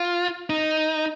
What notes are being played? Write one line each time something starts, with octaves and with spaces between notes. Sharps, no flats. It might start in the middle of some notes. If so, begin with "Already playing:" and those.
Already playing: F4
D#4